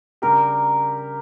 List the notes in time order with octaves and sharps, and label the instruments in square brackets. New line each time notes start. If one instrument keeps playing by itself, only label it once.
[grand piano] C#3 G3 D4 G4 [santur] A#4